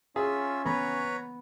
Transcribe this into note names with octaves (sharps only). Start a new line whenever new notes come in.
C#4 F4 G#4 E5
B3 B4 C#5 A#5